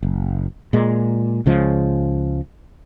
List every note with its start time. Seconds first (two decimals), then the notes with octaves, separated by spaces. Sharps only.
0.03 F#1
0.73 A#2 G#3
1.46 C#2 C#3 F3 G#3